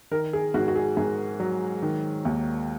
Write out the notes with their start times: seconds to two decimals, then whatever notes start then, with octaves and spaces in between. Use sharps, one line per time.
0.11 D#3 A#4
0.33 G#4
0.54 G#2 F#4
0.68 F#4
0.76 G#4
0.97 G#2 G#4
1.40 F#3
1.82 D#3
2.25 D#2